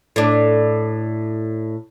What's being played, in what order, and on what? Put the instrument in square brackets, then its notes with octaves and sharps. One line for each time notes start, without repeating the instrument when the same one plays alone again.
[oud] A2 D4